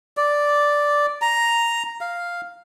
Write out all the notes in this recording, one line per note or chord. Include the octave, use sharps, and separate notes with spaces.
D5
A#5
F5